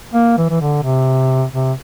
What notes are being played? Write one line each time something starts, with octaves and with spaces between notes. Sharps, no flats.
A#3
E3
E3
D3
C3
C3